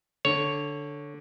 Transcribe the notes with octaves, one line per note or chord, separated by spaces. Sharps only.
D3 C#5